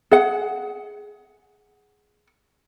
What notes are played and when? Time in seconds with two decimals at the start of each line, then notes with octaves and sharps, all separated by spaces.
0.11 G#4 F#5